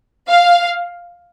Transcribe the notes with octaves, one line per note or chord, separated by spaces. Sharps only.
F5